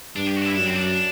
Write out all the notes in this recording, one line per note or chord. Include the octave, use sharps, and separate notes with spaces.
G2 D4
G4
F#4
D4
E4
F#2 D4
C4
D4